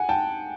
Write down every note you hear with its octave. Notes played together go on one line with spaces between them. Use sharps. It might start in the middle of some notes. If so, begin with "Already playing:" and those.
Already playing: F#5 G#5
G5 A5